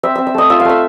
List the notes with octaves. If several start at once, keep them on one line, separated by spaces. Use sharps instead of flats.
C4 E5
C4 E5
E5
A3 D#5
F4 E5
F5
A3 E5